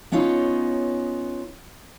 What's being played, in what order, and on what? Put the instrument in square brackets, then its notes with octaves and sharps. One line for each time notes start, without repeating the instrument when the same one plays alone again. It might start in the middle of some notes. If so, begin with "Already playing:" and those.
[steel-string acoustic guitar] B3 C#4 D#4 F4 C#5